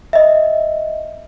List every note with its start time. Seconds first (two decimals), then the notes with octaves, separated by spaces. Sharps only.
0.13 D#5 E5